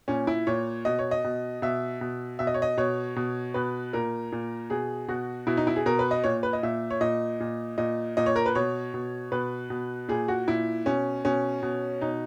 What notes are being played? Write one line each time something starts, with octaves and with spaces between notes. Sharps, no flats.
A#2 C#4
E4
A#2 C#5
B2 D#5
C#5
D#5
B2
B2 E5
B2
B2 E5
D#5
C#5
D#5
B2 C#5
B2
B2 B4
A#2 A#4
A#2
B2 G#4
B2 F#4
B2 E4
D#4
E4
G#4
B2 A#4
B4
D#5
A#2 C#5
B4
D#5
A#2 E5
C#5
A#2 D#5
A#2
A#2 D#5
A#2 D#5
C#5
A#4
B4
B2 C#5
B2
B2 B4
B2
A#2 G#4
F#4
A#2 E4
B2 C#4
B2 C#4
B2
B2 D#4